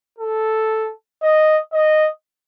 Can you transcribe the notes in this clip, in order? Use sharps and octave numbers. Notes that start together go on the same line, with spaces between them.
A4
D#5
D#5